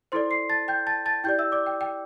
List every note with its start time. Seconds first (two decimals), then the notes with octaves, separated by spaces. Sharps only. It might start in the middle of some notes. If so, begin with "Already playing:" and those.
0.12 E4 A4 C5 D5 C6
0.31 C6 C7
0.49 A5 A6
0.68 G5 G6
0.87 A5 A6
1.06 A5 A6
1.24 E4 G4 D5 G5 G6
1.39 E5 E6
1.52 D5 D6
1.66 G5
1.81 G5